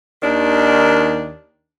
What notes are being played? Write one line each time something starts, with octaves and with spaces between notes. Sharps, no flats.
D#2 D#3 D4